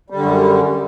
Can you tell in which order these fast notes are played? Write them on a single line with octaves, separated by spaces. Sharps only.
G3 D3 F#2